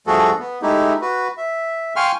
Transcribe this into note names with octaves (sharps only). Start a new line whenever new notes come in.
G2 F3 A3 F#4 G#4 A4
B3
G#3 A3 D#4 E4 G4
F#4 B4
E5
F5 G5 G#5 C6 C#6 F6